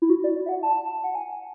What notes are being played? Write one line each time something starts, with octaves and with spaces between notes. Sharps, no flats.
E4
F#4
D5
D5
E5
F#5
A5
F#5
G#5